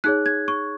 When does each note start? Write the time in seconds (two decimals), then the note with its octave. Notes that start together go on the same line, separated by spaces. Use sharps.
0.04 D#4 G#4 C#5 F#6
0.26 G#6
0.48 C#6